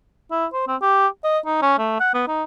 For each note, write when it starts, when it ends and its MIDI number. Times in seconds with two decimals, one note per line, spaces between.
0.31 0.46 64
0.53 0.63 72
0.68 0.76 60
0.81 1.07 67
1.24 1.39 75
1.46 1.60 63
1.62 1.76 61
1.78 1.99 57
2.00 2.10 78
2.14 2.24 59
2.28 2.44 63